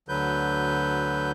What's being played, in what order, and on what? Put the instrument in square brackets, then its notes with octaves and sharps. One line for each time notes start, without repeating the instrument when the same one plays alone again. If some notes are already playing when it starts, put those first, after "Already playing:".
[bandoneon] D2 D3 F#3 B4 G6